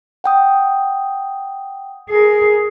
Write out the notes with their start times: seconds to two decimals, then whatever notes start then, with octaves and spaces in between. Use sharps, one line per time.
0.24 F#5 G5 D#6
2.10 G#4 A#4